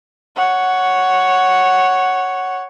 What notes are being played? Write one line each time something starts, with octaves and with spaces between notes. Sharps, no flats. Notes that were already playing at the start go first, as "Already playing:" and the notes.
C#5 F#5